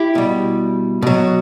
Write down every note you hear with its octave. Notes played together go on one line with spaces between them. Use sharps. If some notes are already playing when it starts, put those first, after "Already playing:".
Already playing: E4 G4
B2 G3
B2 F#3